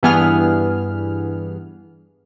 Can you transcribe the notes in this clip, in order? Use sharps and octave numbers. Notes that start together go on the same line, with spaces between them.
G2 E3 B3 G#4 F6